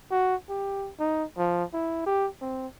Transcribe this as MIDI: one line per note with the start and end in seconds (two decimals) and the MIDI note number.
0.11 0.35 66
0.49 0.90 67
1.00 1.24 63
1.37 1.64 53
1.73 2.04 64
2.06 2.28 67
2.41 2.67 60